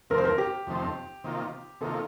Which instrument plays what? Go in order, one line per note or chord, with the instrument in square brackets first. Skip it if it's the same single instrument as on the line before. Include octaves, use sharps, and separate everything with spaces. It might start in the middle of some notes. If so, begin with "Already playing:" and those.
[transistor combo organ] F2 C3 D#3 A3 C4 [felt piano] A#4
[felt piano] C5
A#4
G4
[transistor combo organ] F2 C3 D#3 A3 C4
C3 D#3 A#3 F4
[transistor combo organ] C3 D#3 A#3 F4 [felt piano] A4